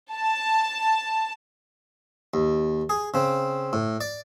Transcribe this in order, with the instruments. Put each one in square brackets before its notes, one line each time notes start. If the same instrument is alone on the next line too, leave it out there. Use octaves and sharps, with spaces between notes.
[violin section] A5
[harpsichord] D#2
G#4
C#3 C4
A2
D5